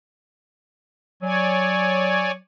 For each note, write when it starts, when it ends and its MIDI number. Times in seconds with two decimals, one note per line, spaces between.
1.23 2.38 54
1.23 2.31 73
1.23 2.31 74
1.23 2.31 80